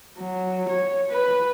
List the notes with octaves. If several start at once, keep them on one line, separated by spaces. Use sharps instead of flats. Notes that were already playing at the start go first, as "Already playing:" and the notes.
F#3
C#5
B4